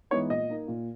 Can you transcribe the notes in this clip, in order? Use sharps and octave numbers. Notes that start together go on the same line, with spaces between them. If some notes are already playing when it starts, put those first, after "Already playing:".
E3 G#3 B3 D#4 C#5
A#2 D#5
A#3 D#4
A#2